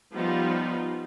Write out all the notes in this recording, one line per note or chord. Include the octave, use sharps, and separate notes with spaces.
F3 G3 B3 D#4 F4